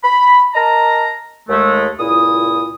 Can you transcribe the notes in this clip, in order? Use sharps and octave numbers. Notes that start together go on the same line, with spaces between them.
B5
A#4 D#5 A5 A#5
D#2 G#3 A3
C#2 A#2 E4 D#6